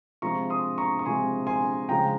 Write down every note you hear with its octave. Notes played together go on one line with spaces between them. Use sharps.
C3 F3 G#3 A#5 C#6
C6 D#6
A#5 C#6
C#6
C3 F3 G#3 G#5 C6
G#5 C6
C#3 F3 G#3 G5 A#5